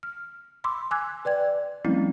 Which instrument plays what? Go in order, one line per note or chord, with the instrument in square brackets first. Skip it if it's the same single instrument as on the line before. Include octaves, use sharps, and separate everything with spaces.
[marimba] F6
B5 C6 D6 E6
G#5 D6 E6 F#6 G#6
B4 D5 G5 G#6
F3 G3 A3 C4 C#4 E4